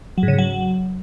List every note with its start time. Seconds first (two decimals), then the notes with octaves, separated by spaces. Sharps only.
0.18 F#3
0.23 G#2
0.28 C#3
0.33 G#2
0.38 F#3